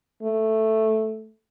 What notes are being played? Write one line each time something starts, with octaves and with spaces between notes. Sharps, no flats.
A3